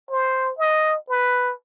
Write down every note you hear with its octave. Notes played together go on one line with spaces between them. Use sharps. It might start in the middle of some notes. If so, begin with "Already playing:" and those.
C5
D#5
B4